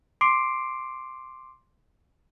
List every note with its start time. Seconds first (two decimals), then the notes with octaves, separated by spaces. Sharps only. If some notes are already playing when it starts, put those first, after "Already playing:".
0.21 C6 D6 C7 D7